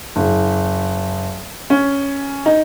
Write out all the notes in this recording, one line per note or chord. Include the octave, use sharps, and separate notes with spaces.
F#1
C#4
D#4